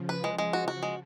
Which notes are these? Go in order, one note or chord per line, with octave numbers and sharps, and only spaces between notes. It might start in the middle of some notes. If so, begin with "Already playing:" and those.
Already playing: C#3 F3
B4
G#3
G#3
F#4
F#4
G#3